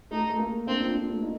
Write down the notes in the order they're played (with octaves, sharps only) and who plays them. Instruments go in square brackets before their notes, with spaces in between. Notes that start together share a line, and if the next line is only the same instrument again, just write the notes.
[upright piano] A3 [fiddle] D#4
[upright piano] A3
A#3
[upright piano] A#3 D4 [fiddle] C4
[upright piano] D4 F4
D4 F4
A3
D#4